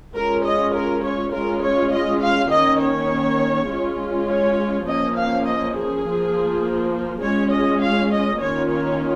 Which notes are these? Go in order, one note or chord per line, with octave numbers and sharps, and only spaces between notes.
G#3 C#4 F4 A#4
D#5
A#4
C#5
G#3 C#4 F4 A#4
C#5
D#5
F5
D#3 A#3 C#4 D#5
C#5
G#3 C#4 F4
C#5
F3 A#3 C#4 D#5
F5
D#5
G#4
F3 A#3 F4
G#3 C#4 F4 C#5
D#5
F5
D#5
D#3 A#3 C#4 F4 C#5
C#5